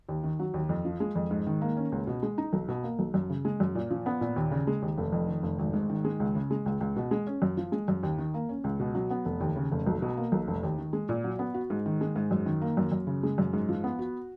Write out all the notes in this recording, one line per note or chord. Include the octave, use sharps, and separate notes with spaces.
D#2
D#3
F#3
D#2
F2
F3
G#3
F2
G#2
D#3
A#3
C#4
C#2
B2
G#3
D#4
B1
B2
A#3
B1
F#2
C#3
G#3
F#2
A#2
F3
B3
A#2
D#2
C#3
G#3
D#2
F1
F2
D#3
F1
G#1
G#2
D#3
G#3
C#2
C#3
G#3
C#2
C#2
B2
G#3
C#4
F#2
F3
G#3
F#2
D#2
D#3
A#3
C#4
C#2
B2
F#3
B3
F1
D#2
C#3
F1
B1
B2
A#3
B1
F1
D#2
D#3
G#3
A#2
F#3
B3
F#4
G#2
D#3
G#3
G#2
F#2
D#3
A#3
F#2
F#2
C#3
G#3
F#2
G#2
F3
B3
F#4